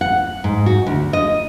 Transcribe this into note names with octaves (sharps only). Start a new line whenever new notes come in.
F#5
G#2
F#4
D2
D#5